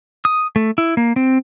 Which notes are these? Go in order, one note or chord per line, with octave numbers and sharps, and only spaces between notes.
D#6
A3
E4
A#3
C4